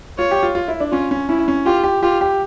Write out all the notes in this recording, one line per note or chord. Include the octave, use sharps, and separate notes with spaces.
F4 C#5
G4
F4
F4
E4
D4
C#4 F4
C#4
C#4 E4
C#4
F4 G4
G4
F4 G4
G4